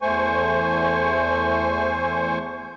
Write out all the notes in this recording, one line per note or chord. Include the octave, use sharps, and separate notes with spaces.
E2 A3 C5 G#5 C#6